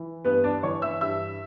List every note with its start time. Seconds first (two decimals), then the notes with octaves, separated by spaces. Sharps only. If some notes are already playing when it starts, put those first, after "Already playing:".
Already playing: E3
0.25 G2 B3 B4
0.44 D4 D5
0.63 E3 C#5 C#6
0.82 E5 E6
1.01 G2 E5 E6